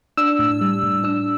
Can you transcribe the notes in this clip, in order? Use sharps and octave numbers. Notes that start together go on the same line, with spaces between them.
D4 E6
A2
G3
A2
D4 E6